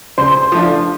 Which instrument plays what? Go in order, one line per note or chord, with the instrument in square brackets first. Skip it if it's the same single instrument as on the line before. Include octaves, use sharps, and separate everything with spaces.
[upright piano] C#3 [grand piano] C5 C6
[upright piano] F3 A3 D4 F4